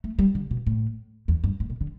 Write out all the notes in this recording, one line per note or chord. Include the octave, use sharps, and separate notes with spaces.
A3
G3
D3
B2
A2
E2
G2
A2
B2
D3